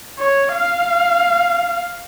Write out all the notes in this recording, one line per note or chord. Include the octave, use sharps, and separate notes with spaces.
C#5
F5